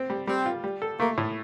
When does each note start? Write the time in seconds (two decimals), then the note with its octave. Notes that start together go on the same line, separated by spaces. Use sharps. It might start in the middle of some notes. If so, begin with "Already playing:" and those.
Already playing: C4
0.10 G3
0.27 G3 C4
0.46 F4
0.64 G3
0.82 A4
0.99 A3 A#3
1.18 A2